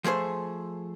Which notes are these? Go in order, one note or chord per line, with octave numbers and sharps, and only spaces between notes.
F3 A3 G#4 C5